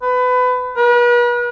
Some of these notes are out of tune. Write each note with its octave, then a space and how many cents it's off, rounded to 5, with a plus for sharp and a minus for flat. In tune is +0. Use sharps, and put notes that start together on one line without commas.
B4 +25
B4 -40